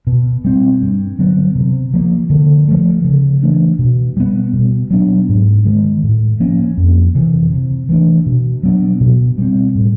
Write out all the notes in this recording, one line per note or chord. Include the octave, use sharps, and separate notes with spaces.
B2
G3 C4
G2
D3 F#3 B3
C3
F3 A#3
D3
F3 A3
C#3
E3 A3 D4
B2
G3 B3
B2
F#3 B3 D4
G#2
D#3 G#3
A2
F3 A#3 C#4
F2
C3 E3
C3
E3 A3 D4
B2
F#3 B3 D4
B2
G3 C4
A2